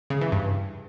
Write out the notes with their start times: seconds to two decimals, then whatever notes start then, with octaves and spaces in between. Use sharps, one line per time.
0.10 C#3
0.21 E3
0.32 G2